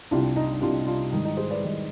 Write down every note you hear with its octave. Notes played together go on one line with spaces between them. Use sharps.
C2 C3 G3 D4 F4
D#4
C2 C3 G3 D4 F4
D4 F4
G#2 D#3 G3 D#4
D#4
G#4 C5
B4 D5
G#2 D#3 G3